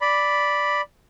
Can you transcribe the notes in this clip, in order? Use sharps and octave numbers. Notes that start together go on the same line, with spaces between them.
D5 B5